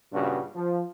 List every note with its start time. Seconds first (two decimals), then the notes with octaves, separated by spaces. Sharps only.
0.12 G2 A#2 C#3 D4 F#4
0.56 F3